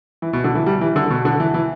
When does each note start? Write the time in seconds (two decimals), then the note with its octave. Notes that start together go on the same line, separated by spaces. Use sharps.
0.22 E3
0.33 B2
0.44 D3
0.55 E3
0.66 G3
0.81 E3
0.96 D3
1.10 B2
1.25 D3
1.40 E3
1.54 E3